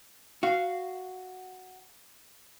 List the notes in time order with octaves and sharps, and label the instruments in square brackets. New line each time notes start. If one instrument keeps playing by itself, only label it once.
[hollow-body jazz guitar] F#4 [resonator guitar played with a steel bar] F5